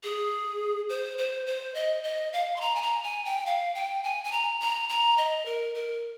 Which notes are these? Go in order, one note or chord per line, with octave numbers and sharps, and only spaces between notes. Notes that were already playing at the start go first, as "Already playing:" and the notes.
G#4
C5
C5
C5
D#5
D#5
F5
C6
A#5
G#5
A#5
G#5
G5
F5
G5
G#5
G#5
A#5
A#5
A#5
D#5
A#4
A#4